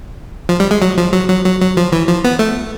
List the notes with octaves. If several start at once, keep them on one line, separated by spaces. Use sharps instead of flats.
F3
G3
G#3
F#3
F3
F#3
F#3
F#3
F#3
F3
E3
F3
B3
A3